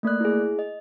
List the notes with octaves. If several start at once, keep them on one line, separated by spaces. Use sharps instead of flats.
A3 A#3 D5 F#6
E4 G#4
D#5